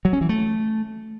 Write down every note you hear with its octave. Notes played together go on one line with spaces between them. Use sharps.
F#3
C#4
E3
A3